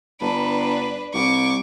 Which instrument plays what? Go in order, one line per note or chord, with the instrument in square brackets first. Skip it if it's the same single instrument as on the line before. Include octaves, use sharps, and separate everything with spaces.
[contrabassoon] G1 [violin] D4 B4
[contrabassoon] C2 [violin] C#6 D6